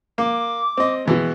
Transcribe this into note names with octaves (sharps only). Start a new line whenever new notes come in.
A#3 D6
C4 D#5
B2 E3 G#3